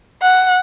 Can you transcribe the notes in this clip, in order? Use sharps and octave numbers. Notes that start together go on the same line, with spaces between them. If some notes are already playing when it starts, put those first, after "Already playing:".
F#5